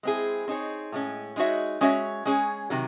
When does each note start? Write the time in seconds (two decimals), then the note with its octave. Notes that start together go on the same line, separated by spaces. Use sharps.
0.03 G#3 C4 E4 G#4
0.48 C4 D#4 G#4 C#5
0.92 A2 G#3 C#4
1.36 G#3 D#4 F#4 C#5 E5
1.81 G#3 C#4 F#4 C#5 E5
2.25 G#3 C#4 G#4 C#5
2.70 C3 D#3 F#3